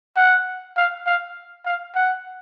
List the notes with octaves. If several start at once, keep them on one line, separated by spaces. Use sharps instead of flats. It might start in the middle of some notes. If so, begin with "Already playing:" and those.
F#5
F5
F5
F5
F#5